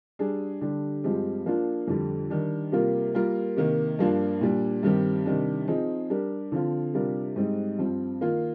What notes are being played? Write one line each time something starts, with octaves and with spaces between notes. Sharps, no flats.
G3 D4 G#4
D3 G3 D4 G4
G2 F3 G#3 C4 G4
F3 A#3 D4 F4
F2 D3 G3
D#3 G3 D4
C3 G3 A#3 F4 A#4
G3 A#3 F4 A#4
C3 D#3 A#3
G2 F3 A#3 D4 F4
A#2 G3 D4
G2 D#3 G3 C4 G4
C3 D#3 G3 D4
F3 C4 D#4 G#4
G3 D4 G4 A#4
D3 F3 C4 F4
C3 G3 D4 F4 A#4
G#2 G3 C4 D#4
G2 F3 C4
D#3 A#3 F4